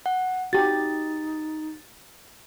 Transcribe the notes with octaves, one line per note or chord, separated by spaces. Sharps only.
F#5
D#4 F#4 G4 A6